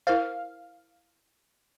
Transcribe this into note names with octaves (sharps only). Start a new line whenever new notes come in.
E4 A#4 C5 F5